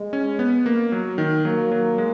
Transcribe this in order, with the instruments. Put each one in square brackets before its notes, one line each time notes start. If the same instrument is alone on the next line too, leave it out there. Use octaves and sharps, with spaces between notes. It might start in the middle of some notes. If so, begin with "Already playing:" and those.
Already playing: [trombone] G#3
[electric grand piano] C#4
B3
A#3
F#3
D#3
[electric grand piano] F#3 [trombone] A#3
[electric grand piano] F#3
G#3